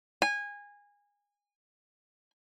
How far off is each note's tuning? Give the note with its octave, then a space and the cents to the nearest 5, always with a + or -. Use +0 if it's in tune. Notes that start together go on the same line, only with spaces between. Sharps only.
G#5 -25